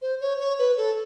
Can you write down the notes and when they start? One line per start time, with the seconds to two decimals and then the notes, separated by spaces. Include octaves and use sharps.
0.02 C5
0.21 C#5
0.40 C#5
0.59 B4
0.77 A4